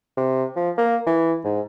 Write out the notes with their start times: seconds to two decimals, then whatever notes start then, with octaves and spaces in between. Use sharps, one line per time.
0.17 C3
0.56 F3
0.77 A#3
1.06 E3
1.44 G#2